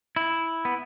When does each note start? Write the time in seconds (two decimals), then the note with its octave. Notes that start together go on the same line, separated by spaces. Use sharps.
0.16 E4
0.65 B3